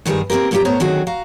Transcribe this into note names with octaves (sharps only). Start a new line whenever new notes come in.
G2 D#3 G3 G#3 G#4
A#3 C4 F#4 G4 A#4
F#2 A#2 G3 F4 G4 A#5
A2 B3 C5 C#5 A#5
D3 D#3 F#3 C4 F#4 G#4
F#4 F5 A#5